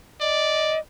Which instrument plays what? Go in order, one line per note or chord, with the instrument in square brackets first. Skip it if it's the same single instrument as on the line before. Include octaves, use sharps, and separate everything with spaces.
[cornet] D5 [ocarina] D#5